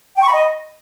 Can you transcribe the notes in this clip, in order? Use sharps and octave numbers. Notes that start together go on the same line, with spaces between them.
G5
C#6
B5
D#5